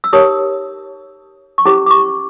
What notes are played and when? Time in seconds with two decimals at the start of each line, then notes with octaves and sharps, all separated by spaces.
0.04 E6
0.13 D#4 G4 A#4 C#5 D#6
1.58 C#6
1.65 C#4 E4 G4 C5 D6
1.86 D6
1.91 C#6